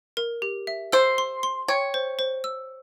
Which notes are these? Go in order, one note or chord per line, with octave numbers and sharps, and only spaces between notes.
A#4
G4
E5
C5 E6
C6
C6
C#5 G5
C5
C5
E6